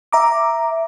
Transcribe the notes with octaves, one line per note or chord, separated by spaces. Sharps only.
E5 A#5 D6